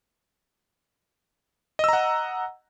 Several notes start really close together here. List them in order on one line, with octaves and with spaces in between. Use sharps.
D#5 E6 A#5 F#5